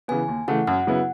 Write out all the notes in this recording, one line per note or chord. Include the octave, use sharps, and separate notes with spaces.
C#3 E3 B3 G#5
D#2
C#3 E3 A3 F#5
F#2 F#5
C#3 F#3 B3 E4